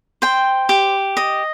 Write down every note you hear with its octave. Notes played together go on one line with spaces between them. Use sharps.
C5 G5
G4
D#5